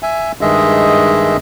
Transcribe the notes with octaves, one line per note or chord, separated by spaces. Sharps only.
E5 G#5
G2 D#3 G#3 G#4 D#5 E5